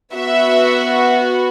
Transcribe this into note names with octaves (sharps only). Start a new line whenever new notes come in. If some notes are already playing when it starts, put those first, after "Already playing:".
B3 F#4 E5